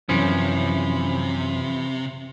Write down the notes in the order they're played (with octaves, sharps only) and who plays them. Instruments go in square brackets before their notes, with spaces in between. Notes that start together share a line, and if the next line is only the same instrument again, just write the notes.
[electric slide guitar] F#2 [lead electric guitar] C3 [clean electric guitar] E3 F3 C#4